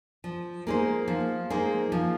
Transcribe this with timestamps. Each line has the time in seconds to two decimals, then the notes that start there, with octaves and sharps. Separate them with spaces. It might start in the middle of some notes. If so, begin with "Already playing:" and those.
0.24 F3
0.67 A#3 D#4 G#4 C5
1.08 F3
1.50 A#3 D#4 G#4 C5
1.92 F3